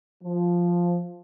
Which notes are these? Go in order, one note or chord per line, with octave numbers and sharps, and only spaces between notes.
F3